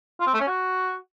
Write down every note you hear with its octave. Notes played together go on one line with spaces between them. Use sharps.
F4
C4
A3
C#4
F#4